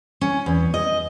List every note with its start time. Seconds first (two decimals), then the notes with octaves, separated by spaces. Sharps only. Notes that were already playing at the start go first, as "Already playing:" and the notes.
0.21 C#4
0.46 E2
0.74 D#5